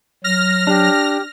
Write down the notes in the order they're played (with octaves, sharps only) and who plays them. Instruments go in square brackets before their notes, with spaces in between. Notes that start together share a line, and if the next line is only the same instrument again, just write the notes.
[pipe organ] F#3 [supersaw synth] F6 A#6
[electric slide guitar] D4 [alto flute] G4